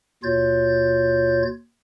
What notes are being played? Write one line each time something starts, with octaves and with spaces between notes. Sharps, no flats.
D#2 B2 F4 C#5 G6 A6